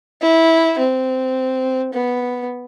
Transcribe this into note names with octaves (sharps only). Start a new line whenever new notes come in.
E4
C4
B3